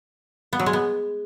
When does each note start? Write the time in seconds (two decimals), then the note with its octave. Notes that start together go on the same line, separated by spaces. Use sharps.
0.53 B3
0.59 F#3
0.66 G#3
0.73 B3